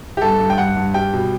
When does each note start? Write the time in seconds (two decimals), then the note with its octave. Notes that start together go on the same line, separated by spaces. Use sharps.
0.17 G4
0.22 G2 A4
0.40 G2
0.50 G5
0.58 G2 F#5
0.77 G2
0.94 G3 G5
1.13 B2